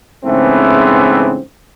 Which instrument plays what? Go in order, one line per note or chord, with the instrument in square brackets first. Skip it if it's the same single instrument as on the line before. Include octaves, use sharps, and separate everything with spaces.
[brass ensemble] G#2 C#3 E3 A3 B3 C4